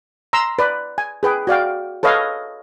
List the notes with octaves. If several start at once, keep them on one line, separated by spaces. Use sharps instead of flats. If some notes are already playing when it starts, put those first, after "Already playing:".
A#5 C6 E6
B4 D5
G#5
G#4 B4 G5
F#4 D5 F5 G5
A4 B4 C#5 D#5 F5